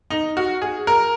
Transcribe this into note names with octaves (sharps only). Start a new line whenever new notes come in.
D#4
F#4
G#4
A#4